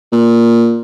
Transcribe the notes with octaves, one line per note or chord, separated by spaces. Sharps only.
A#2